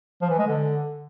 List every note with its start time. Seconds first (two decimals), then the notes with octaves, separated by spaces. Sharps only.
0.22 F3
0.30 E3
0.38 G#3
0.47 D3